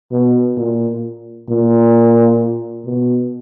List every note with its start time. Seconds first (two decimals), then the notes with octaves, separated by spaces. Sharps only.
0.11 B2
0.57 A#2
1.49 A#2
2.85 B2